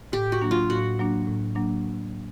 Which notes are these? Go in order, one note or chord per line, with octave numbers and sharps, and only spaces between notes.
A2 G4
F#4
F#3 A#3 D4
F4
A2 F#4
F#3 A#3 D4
A2
F#3 A#3 D4